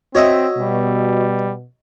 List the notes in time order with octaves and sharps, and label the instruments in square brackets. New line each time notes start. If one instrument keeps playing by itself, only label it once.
[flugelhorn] C4 [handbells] F#4 [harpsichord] C#5 D#5 E5
[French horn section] B2 [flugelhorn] G3